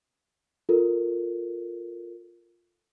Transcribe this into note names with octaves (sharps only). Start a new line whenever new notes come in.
F4 A4 A#4